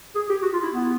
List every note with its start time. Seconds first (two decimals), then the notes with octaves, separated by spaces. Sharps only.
0.15 G#4
0.29 G4
0.42 F#4
0.53 F4
0.63 E4
0.74 B3